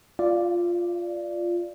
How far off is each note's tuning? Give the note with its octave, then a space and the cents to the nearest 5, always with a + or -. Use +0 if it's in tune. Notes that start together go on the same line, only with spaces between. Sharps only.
F4 +0 D5 +0 F5 -35